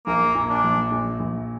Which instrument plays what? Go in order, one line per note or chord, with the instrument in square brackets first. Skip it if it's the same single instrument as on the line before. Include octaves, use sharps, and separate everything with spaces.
[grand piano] A#1 [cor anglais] A#3
[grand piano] A#2
[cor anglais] D4
[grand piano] A#1
A#1
A#1